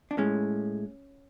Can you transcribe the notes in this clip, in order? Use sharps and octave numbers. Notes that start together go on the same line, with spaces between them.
D4
A2 G#3 C#4